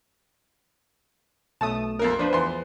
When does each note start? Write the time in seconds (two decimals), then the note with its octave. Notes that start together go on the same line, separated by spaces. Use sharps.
1.61 B1 A3 A5 D#6
1.99 F2 A#3 A#4
2.19 F3 D4 B4 C5
2.33 E2 C6